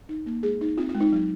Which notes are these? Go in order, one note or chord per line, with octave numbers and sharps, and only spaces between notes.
D#4
A#3
G#3 G#4
D#4
C4 F4
F4
G#3
D#4
F#3